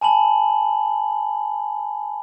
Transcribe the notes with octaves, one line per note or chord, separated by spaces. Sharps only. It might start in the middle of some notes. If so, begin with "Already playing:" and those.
G#5 A5 B5 F#7